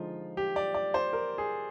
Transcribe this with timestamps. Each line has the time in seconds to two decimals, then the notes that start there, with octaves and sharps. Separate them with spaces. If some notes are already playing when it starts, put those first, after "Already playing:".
Already playing: D3 F3 G#3 D#4 F4
0.37 G4
0.56 D5
0.75 D5
0.94 C5
1.13 A#4
1.38 G#4